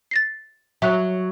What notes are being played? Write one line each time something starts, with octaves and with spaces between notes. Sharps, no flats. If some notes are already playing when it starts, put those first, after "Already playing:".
A6 A#6 C7
F#3 E5 F#6 F7